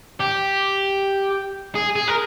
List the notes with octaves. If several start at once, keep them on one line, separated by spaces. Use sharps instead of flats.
G4
G#4
G#4
A#4